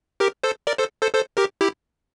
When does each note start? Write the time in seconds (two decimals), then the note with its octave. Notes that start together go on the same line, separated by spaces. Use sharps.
0.20 G4 A#4
0.43 A4 C5
0.67 A#4 D5
0.78 A4 C5
1.02 A4 C5
1.14 A4 C5
1.37 G4 A#4
1.61 E4 G4